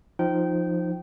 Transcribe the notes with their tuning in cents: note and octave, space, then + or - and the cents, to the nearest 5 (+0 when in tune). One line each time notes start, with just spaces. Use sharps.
F3 +0 D#4 +0 G5 -20